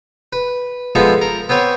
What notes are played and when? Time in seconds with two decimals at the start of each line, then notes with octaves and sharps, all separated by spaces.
0.33 B4
0.95 F3 G#3 B3 A4 E5
1.21 A#4
1.49 B3 C4 B4 C#5